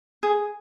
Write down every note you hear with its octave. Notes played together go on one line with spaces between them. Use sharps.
G#4